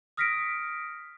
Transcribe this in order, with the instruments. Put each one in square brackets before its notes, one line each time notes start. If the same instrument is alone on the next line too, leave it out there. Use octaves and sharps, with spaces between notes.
[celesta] D#6 F6 A#6 B6 C#7 D7